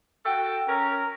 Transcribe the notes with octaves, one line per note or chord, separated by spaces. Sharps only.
F#4 A4 G5
C#4 A#4